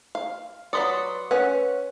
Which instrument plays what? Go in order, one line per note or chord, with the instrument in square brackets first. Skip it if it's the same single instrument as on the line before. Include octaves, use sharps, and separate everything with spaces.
[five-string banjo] F5
[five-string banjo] F#3 B4 D5 [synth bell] C6 D#6 C#7
[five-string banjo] C#4 F#5 [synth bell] B4